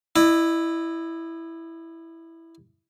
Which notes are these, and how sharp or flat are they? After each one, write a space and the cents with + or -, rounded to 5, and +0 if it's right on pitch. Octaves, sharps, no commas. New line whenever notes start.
E4 +0 D#5 -40